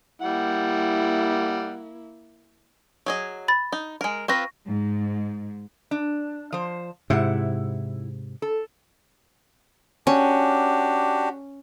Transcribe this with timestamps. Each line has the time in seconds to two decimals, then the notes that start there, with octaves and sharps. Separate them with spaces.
0.22 G3 A#3 E4 F#5
3.06 F#3 G#4 D#5
3.48 B5 A6
3.72 D#4
4.01 G#3 A#4
4.28 C4 F4 B4 C#6 A#6
4.67 G#2
5.91 D4
6.52 F3 C5
7.10 G#2 C3 E4 F#5
8.42 A4
10.07 C#4 D4 F#4 G4